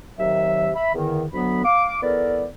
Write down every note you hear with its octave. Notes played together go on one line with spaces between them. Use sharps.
D#2 C3 D#3 F#3 E5
E5 B5
E2 D3 D#3
D2 F#3 B3 B5
F5 D6
E2 B3 A4 A#4 D5